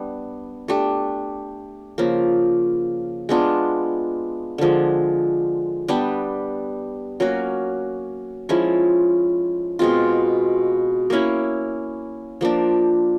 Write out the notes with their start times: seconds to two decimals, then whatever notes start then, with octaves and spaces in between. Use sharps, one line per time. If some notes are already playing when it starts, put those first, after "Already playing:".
Already playing: G3 B3 D4
0.68 A3 D4 G4
1.98 C#3 F3 A#3
3.29 G#3 B3 D4 F4
4.58 D3 F3 G#3
5.88 G3 B3 D4 G4
7.20 F#3 A#3 C#4 F#4
8.49 F3 G#3 C#4 E4
9.79 B2 G#3 C4 F4
11.10 A#3 C#4 E4
12.41 F3 A#3 D4